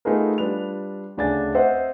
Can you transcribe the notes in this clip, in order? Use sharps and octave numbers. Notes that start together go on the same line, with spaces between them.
A3 B3 D#4 F4 G#4 A#4
G3 D4 F4 B4 F7
D2 C#3 D4 G#5 A6
C4 C5 D#5 E5 F#5